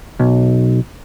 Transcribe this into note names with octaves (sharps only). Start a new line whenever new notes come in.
B1